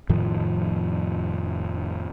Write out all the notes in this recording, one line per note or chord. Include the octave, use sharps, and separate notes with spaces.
F2 A2 D#3 F3